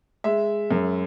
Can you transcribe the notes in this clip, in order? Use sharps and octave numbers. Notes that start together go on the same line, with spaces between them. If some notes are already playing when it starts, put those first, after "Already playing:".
G#3 E5
F#2